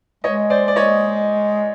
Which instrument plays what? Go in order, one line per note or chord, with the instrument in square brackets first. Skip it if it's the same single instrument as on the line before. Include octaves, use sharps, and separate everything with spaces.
[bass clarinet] G#3 [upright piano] C#5 D#5
[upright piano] C5 D5
D5
C#5 D#5